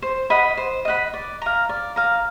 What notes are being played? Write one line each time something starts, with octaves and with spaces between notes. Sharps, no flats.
C5
D#5 F#5 B5
C5
D#5 F#5 B5
D5
F5 A#5
D5
F5 A#5